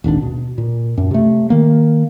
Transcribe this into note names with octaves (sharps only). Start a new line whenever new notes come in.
D#1 G#1 G#2 D4
B2
A#2
F#2
C3 A3
D#3 A#3